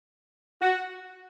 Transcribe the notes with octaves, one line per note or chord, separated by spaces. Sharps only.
F#4